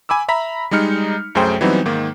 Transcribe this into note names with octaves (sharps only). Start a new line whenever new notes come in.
G#5 B5 D6 E6
E5 A#5 B5 B6
G3 G#3 D#4 F6 C#7
C2 F#2 A3 G#4 C5 G5
E3 F#3 G3 B3 C4 D#4
G#2 D#3 A#3